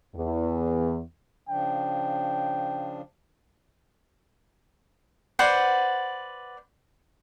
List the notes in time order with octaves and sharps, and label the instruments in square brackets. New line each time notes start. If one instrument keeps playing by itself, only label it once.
[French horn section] E2
[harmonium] C#3 F3 D4 [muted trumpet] G5
[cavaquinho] B4 C5 D5 F#5